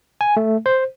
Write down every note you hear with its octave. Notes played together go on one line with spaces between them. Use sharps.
G#5
A3
C5